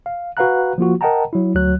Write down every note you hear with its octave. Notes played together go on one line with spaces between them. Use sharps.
F5
F#4 B4 F5 F#5 A#5 F#6
F3 A#3 F4 F#4
A#4 D#5 F#5 G5 A5 A#5
F#3 E4
D2 F#3 F#6